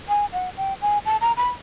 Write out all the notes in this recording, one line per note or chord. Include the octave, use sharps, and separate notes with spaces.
G#5
F#5
G5
G#5
A5
A#5
B5